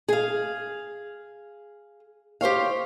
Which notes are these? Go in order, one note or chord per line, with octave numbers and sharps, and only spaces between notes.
G#4 F5
G4 C5 C#5 F5